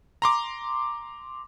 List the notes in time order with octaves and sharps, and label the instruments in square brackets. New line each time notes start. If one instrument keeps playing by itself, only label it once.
[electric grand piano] A#5 C6 D6